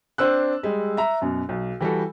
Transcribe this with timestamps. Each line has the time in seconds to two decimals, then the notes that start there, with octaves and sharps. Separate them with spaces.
0.18 C4 D4 C5 E6 F#6
0.63 G3 G#3
0.97 E5 A#5
1.22 F#2 B2
1.49 B1
1.81 E3 G3 F#4 A4